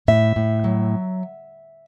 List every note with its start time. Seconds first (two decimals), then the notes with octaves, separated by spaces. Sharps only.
0.08 A2 E5
0.36 A2
0.64 F#3